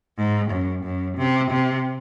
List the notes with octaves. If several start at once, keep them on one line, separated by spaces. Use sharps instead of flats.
G#2
F#2
F#2
C3
C3